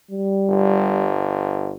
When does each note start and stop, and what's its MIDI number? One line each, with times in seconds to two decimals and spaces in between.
0.11 1.15 55
0.49 1.75 31